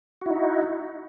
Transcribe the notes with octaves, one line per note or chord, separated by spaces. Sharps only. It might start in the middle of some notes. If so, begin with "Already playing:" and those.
D#4 E4 F#4